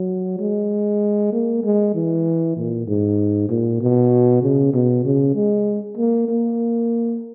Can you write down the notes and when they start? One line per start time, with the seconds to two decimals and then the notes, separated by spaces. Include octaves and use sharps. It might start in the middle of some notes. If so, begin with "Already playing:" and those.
Already playing: F#3
0.40 G#3
1.32 A#3
1.64 G#3
1.95 E3
2.57 A#2
2.87 G#2
3.50 A#2
3.81 B2
4.43 C#3
4.74 B2
5.05 C#3
5.35 G#3
5.97 A#3
6.28 A#3